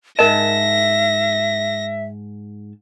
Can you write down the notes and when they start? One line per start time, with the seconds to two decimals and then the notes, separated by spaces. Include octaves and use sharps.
0.19 G#2 A#4 D#5 E5 A5 A#6